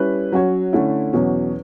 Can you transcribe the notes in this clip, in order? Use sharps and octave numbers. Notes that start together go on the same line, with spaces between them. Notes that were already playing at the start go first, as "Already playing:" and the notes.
Already playing: G3 C#4 E4 B4
F#3 C#4 F#4 C#5
D3 A3 C#4 E4
E2 B2 F#3 C#4